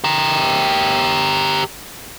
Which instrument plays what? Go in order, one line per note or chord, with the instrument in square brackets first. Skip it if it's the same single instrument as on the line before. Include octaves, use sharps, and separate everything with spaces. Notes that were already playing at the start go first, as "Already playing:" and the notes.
[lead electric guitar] G4 A#4